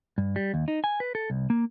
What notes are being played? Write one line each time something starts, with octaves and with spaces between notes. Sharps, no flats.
G2
G3
D#2
D#4
G#5
B4
A4
C2
A#3